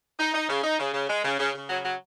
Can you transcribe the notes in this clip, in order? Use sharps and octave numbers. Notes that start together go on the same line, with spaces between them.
D#4
D#4
C#3
D#4
C#3
C#3
G#3
C#3
C#3
C#3
F#3
F#3